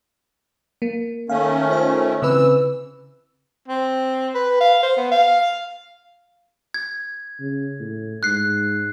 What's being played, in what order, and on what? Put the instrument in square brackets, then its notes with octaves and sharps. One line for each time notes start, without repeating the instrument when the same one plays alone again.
[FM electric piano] A#3
[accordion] D#3 A3 C#4 [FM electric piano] F5
[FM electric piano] F4 C5 E5
[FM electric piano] C#3 C4 B4 [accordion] E3 E6
[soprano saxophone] C4
B4
F5
C5
B3
F5
[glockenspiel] G#6
[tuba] C#3
A2
[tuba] G#2 [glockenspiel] F#6 C7